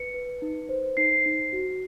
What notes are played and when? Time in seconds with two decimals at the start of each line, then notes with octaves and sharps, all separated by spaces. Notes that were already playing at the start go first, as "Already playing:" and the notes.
Already playing: B4 C#7
0.14 B4
0.42 D#4
0.69 C5
0.97 D#4 C7
1.26 D#4
1.53 F#4